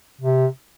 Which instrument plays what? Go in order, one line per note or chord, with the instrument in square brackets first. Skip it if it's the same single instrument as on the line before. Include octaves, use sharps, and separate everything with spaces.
[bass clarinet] C3